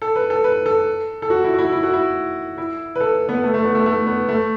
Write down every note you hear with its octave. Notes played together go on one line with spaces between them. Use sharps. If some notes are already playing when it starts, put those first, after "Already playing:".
A4
B4
A4
B4
A4
A4
F#4
E4
F#4
E4
E4
F#4
E4
E4
B4
A4
B3
A3
A3
B3
A3
A3
B3
A3